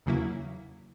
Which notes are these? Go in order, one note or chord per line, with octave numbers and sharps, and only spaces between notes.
E2 C#3 F#3 A#3 E4